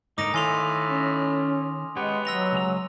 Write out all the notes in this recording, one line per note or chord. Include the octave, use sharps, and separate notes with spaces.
G#2 D3 D#4 A#4 D6 D#6 A#6
A2 D#3 F5 G#5 A#5 C6 F7
C#4
G#3 B3 G4 C#5
F#3 E6 A#6 F7
C#2 G#3 A#5